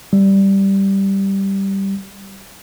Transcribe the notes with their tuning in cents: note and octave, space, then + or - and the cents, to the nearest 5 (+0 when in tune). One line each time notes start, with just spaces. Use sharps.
G3 -5